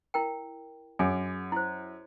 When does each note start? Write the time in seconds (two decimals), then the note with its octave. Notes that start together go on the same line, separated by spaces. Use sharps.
0.14 E4 A#4 G5
0.99 F#2 G#4 G#5
1.52 E4 C5